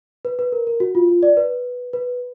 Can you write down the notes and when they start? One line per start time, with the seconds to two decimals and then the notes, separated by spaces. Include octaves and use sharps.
0.25 B4
0.39 B4
0.52 A#4
0.67 A#4
0.80 F#4
0.95 F4
1.09 F4
1.23 D5
1.37 B4
1.93 B4